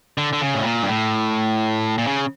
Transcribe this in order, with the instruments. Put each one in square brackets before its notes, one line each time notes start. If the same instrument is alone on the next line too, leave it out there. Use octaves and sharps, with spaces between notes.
[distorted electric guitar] D3
D3
C#3
A2
A#2
G2
A2
A#2
C#3